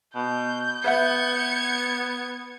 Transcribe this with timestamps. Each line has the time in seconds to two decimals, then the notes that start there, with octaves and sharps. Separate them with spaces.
0.15 B2 G6
0.84 B3 B4 E5 F#5 G#6 C#7